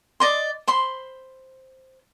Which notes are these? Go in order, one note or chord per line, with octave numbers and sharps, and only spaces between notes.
D5 D#5 C6
C5 B5 C6